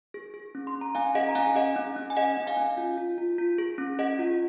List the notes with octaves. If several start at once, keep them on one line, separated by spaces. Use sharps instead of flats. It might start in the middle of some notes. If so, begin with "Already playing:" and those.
G#4
G#4
C#4
C6
C#4
A#5
C#4 F5 G#5
G#4 D#5 F#5
A#5
C#4 F5 G#5
G#4 D#5 F#5
C#4
C#4
G#5
G#4 D#5 F#5
C#4
F5 G#5
C#4
F4
F4
F4
F4
G#4
C#4
G#4 D#5 F#5
F4